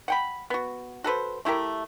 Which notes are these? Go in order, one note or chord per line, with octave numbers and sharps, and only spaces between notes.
F#5 G5 B5
B3 F#4
F#4 A4 B4 C5
A3 E4 G4 A#4